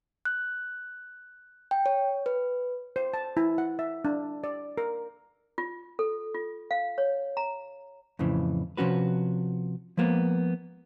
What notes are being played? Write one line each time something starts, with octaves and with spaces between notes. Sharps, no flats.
F#6
G5
C#5
B4
C5
A5
E4
F#5
E5
D4
D5
A#4
F4
A4
F4
F5
C#5
A#5
F2 A2 C#3 E3
C3 F3 C#4 F#4 B4
F3 G#3 A#3 B3